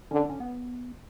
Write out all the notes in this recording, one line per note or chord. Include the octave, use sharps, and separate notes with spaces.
D3 C#4
C#4
B3